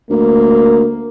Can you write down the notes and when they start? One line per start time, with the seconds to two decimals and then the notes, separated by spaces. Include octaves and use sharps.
0.10 D2 A#3